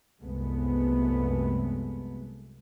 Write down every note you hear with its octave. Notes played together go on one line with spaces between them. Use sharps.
C2 F#2 G#3 A3 B3